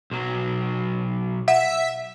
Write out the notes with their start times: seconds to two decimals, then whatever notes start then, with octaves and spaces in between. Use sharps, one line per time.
0.11 B1 F#3
1.48 E5 F#5